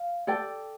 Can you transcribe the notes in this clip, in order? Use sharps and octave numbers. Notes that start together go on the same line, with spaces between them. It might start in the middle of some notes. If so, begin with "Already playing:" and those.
Already playing: F5
A4 D5 G5